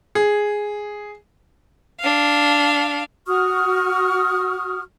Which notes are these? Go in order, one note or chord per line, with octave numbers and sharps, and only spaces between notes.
G#4
D4 F5
F#4 C#6 D#6 F6